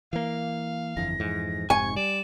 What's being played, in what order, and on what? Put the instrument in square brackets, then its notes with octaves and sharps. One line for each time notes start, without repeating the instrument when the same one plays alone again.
[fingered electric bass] E3 A#3 [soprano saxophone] F5
[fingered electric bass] G1 F2 E3 [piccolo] A#6
[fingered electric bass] F2 G#2 E3
[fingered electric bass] F1 G#2 C3 [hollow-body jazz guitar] G#5 [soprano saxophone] C#6 [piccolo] G#6
[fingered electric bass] G3 [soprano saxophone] D5 [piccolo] E7